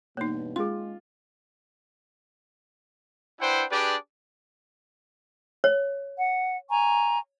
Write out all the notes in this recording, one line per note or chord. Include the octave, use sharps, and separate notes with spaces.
E2 G2 B2 A#3 D#4 C#5
G#3 C#4 F4 G#4 C6
D4 E4 B4 C5 F#5 G5
D4 G4 G#4 B4 D5
C#5
F#5
G#5 A#5 C#6